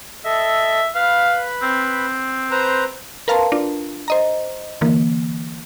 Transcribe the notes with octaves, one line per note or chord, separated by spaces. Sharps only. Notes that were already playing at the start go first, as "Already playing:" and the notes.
A4 D#5 E5
B4 F5 B5
C4
B4 C5 A#5
A#4 B4 F5 A5 A#5 C6
D4 F4
C5 D#5 A#5
D3 E3 A#3